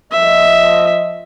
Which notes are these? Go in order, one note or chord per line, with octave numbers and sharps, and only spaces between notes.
F3 D#5 E5